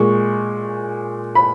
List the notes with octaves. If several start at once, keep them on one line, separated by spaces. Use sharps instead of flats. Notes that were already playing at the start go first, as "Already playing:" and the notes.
Already playing: A#2 G#3 C#6
B5